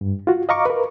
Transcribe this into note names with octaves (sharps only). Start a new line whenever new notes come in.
G2
F4 F#4
D#5 F5 A#5 C#6 D6
A#4 B4